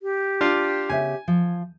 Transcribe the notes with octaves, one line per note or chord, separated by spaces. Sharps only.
G4
D4 F4 F5
C#3 B3 E5 G#5
F3